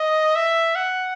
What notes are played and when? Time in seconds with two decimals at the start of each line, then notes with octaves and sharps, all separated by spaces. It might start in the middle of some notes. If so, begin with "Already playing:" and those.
Already playing: D#5
0.35 E5
0.75 F#5